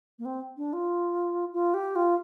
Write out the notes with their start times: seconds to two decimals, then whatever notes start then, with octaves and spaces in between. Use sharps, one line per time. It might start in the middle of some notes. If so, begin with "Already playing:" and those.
0.19 A#3
0.25 C4
0.57 D4
0.73 F4
1.53 F4
1.74 G4
1.95 F4